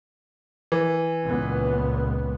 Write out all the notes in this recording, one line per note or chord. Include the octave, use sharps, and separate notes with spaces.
E3
C#2 A#2 B3